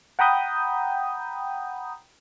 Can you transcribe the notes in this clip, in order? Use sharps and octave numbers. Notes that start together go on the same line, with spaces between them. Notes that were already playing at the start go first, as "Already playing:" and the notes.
F#5 G5 A#5 B5 D#6 G6